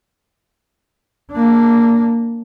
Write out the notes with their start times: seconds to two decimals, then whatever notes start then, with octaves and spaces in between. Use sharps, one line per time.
1.31 A#3 D4